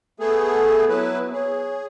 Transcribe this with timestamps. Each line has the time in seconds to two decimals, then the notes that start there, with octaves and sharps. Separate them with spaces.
0.20 A3 B3 G#4 A4
0.89 F#3 B3 E4 B4
1.33 G#4 C#5